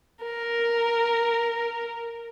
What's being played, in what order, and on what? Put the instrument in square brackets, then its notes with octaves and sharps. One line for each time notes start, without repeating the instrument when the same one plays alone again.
[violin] A#4